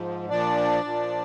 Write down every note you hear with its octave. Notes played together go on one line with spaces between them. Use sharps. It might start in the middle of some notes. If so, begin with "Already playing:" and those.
Already playing: G#2 F3
A#2 F3 D4 D5
A#2 F3